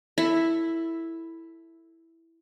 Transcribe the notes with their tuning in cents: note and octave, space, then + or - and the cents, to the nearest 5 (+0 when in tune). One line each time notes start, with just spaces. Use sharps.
E4 +0 A4 +15